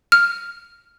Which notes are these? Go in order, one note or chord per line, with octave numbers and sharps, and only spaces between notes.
F6